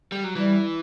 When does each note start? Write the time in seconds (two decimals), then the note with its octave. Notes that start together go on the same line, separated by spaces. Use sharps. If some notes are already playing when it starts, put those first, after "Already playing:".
0.12 G3
0.24 F#3
0.35 E3 G3